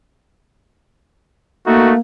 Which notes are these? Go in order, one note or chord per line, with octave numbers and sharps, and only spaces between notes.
A3 A#3 D#4 F#4